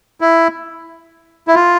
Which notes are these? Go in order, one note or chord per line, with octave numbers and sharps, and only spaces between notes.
E4
E4
F4